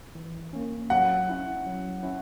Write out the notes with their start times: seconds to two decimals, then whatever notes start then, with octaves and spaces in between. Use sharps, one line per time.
0.15 E3
0.53 A#3 C#4
0.90 F#3 F#5
1.29 C#4 E4
1.66 F#3
2.03 C#4 E4